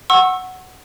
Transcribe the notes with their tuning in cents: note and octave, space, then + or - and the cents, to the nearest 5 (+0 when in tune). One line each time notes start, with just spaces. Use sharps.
F#5 +0 C#6 -35 E6 +0